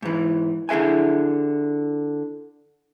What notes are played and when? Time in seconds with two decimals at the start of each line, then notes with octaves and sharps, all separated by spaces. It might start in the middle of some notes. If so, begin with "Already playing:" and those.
0.02 G#2 E3
0.69 D3 E4 G#4 E5 G#5